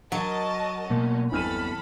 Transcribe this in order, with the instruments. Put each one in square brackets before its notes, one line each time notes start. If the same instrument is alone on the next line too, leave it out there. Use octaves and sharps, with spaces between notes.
[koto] F#3 [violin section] A#4 D#5 A5 [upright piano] F#5
[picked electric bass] B2 A3 A#3 [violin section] C#4
[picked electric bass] G1 E2 C4 [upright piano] E3 F6 D#7 [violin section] A4 B5